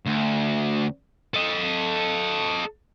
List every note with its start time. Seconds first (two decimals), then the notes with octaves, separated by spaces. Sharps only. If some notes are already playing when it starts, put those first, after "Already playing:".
0.06 D2
1.34 A4 D#5